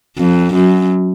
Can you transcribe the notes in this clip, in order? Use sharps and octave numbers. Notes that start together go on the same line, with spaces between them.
F2
F#2